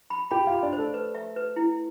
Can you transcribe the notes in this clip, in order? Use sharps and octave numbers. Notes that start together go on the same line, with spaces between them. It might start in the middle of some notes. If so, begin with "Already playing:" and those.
B5
G4 G5 B5
F4 F5
B5
D4 D5
C5
A3 A4
B4
E5
B4
E4